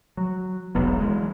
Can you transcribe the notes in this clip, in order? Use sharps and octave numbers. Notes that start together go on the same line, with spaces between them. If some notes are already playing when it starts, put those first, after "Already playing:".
F#3
E1 B1 B3
E3 G#3